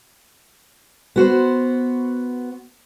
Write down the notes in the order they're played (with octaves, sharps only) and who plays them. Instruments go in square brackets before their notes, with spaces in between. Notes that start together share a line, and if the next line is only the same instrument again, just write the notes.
[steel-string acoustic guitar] B3 F#4 C5